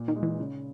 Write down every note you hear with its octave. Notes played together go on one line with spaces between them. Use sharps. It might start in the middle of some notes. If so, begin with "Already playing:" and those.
Already playing: A#2
D#3
G#3 D#4
E3
C#3